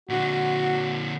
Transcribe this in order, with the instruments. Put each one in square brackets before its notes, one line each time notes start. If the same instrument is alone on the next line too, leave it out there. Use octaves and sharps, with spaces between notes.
[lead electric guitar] A#2 D3 [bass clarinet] F#4